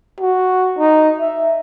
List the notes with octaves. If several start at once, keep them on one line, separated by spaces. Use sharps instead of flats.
F#4
D#4
E5